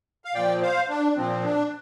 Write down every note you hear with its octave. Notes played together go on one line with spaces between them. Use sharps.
F5
A#2 F3 D5 G5
C5 F5
D4
A#2 F3 C4
D4